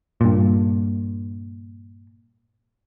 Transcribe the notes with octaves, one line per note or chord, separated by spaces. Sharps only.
G2 A#2